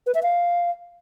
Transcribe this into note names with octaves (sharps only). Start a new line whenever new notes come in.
B4
E5
F5